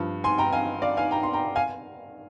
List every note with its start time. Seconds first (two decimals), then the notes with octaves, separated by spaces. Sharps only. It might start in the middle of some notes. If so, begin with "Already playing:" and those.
Already playing: G2 F3
0.24 G#5 C6
0.38 G5 A#5
0.53 F5 G#5
0.82 D5 F5
0.97 F5 G#5
1.11 G5 A#5
1.23 C6
1.33 G5 A#5
1.56 F5 G#5